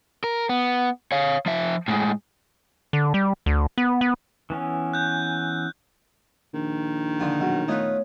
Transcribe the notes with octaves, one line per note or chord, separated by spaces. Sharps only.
A#4
B3
C#5 F5
F3 E5
A2 G#3
D3
G3
D2
B3
B3
E3 B3 C#4
F#6 G6
A#1 D#3
D3 F3 F4
B1 F#3
A3 B3 D#4 F4 B4 C#5